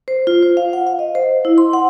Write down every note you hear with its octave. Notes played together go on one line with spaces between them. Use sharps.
C5
F4
C5
F5
F#5
F5
D#5
C5
E4
C6
F#5